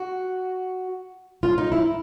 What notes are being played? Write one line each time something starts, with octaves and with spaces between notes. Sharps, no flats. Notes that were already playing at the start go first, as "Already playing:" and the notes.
Already playing: F#4
F4
D#4
E4